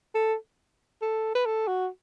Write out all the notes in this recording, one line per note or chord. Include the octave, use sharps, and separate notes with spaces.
A4
A4
B4
A4
F#4